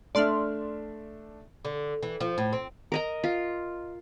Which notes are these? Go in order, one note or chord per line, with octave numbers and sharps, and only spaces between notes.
A3 D4 D5 E5 C6 F6
D3
E3
F3
A2
C4
A#4 D#5 A#5
F4